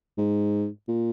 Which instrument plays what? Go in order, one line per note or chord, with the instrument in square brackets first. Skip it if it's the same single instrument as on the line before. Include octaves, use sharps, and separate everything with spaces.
[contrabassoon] G#2
A#2